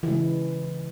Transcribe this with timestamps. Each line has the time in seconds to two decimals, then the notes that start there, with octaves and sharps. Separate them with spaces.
0.03 E3
0.07 C#3
0.10 G#3